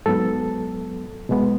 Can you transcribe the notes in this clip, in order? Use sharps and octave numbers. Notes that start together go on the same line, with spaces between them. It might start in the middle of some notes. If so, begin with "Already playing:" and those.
G#2 F#3 B3 A4
B2 G#3 B3